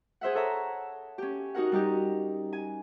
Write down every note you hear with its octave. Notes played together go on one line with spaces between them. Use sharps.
G#4 C5 E5 F#5
A4 C#5 E5 A#5
C#4 G4
D#4 F#4 A#4 F#5
G3 D#4 G4
G#5